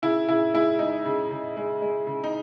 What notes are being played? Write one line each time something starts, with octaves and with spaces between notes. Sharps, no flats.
C#3 E4
C#3 E4
G#3 E4
G#3 D#4
C#3
C#3
G#3
G#3
C#3
D#4